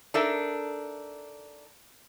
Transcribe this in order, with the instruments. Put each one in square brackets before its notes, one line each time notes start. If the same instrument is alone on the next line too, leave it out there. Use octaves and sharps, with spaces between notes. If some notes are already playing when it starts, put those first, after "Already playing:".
[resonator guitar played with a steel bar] D4 D#4 A4 A#4 E5